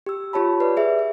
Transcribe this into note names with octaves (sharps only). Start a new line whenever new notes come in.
G4 E6
F4 G4 C#5 A5 B5
B4 D5
G#4 E5
E5